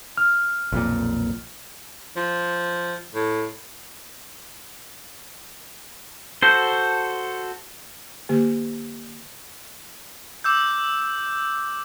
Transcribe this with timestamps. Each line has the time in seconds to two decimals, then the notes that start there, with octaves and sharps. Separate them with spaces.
0.17 F6
0.72 B1 F2 A#2
2.16 F3
3.15 A2
6.42 F#4 A4 C5
8.29 D3 A#3 G4
10.44 D6 E6 G6